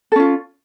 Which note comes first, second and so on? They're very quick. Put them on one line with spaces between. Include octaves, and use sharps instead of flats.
A4 C#4 F4